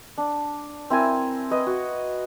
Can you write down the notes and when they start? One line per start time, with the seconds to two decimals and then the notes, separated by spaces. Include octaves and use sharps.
0.18 D4
0.90 C4 E4 A#4 G#5
1.51 B4 D#5
1.67 F#4